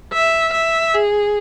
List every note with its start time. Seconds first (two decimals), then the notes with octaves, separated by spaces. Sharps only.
0.13 E5
0.53 E5
0.94 G#4